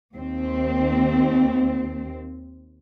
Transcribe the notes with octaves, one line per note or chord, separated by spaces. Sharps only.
D#2 C4